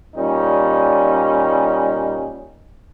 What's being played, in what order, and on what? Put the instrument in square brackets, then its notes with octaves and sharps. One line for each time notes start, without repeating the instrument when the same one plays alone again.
[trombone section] A#2 G3 C#4 D#4